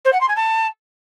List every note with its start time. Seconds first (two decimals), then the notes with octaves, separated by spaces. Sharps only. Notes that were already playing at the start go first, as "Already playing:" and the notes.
0.05 C5
0.13 F#5
0.21 C6
0.28 G#5
0.36 A5